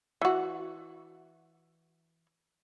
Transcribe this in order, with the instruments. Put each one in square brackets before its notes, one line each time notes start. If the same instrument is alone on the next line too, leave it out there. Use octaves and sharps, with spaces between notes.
[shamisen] E3 F#4